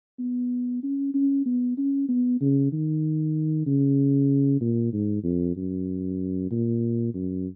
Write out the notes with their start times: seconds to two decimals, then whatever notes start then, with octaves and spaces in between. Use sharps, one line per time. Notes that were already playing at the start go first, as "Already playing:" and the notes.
0.19 B3
0.83 C#4
1.14 C#4
1.46 B3
1.78 C#4
2.08 B3
2.41 C#3
2.72 D#3
3.66 C#3
4.61 A#2
4.93 G#2
5.24 F2
5.56 F#2
6.51 A#2
7.14 F#2